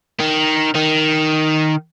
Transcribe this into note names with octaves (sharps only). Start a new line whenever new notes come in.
D#3
D#3